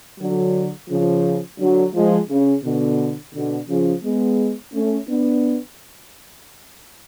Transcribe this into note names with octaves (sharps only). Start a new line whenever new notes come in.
D3 F#3
C#3 F3
D3 F#3
F3 G#3
C#3
B2 D3
B2 D3
C#3 F3
G#3 B3
A3 C#4
B3 D4